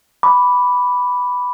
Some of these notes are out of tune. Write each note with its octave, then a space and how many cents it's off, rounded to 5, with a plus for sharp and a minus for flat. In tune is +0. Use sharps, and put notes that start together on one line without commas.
B5 +0 D6 -10